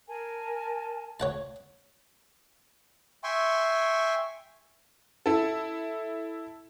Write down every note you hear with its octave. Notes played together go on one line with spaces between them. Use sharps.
A#4 G#5 A5
C#5 F#5 A5
E5 G5 G#5 C6 C#6
E4 A4